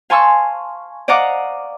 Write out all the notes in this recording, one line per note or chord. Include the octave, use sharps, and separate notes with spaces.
F5 G#5 A5 C6 C#6 E6
D5 D#5 F5 F#5 A#5 D6